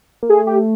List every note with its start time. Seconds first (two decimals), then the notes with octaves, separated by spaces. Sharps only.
0.23 A#3
0.30 A3 G#4
0.47 G4